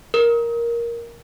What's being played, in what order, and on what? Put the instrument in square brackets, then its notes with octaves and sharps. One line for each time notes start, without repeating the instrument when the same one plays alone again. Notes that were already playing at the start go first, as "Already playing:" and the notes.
[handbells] A#4